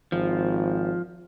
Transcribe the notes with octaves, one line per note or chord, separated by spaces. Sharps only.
G#1 F3